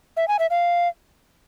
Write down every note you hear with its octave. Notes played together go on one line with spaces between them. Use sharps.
E5
G#5
E5
F5